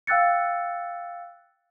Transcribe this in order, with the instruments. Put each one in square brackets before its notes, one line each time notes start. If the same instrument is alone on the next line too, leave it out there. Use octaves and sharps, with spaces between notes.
[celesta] F5 G5 E6 F#6 A6 C#7